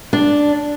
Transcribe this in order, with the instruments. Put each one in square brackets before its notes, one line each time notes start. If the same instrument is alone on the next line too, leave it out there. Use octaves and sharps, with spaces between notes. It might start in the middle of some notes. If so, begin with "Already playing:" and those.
[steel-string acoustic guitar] D4